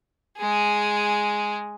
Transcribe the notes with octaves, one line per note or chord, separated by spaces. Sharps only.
G#3 G#4